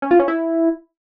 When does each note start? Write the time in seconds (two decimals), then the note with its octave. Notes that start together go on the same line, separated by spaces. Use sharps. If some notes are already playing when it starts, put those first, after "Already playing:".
0.02 C#4
0.11 F4
0.19 C#4
0.28 E4